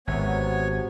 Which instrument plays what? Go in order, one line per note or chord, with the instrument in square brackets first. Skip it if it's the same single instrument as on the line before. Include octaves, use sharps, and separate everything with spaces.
[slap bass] G#1 [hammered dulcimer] C3 F#3 [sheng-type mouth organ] B3 C#5 G#5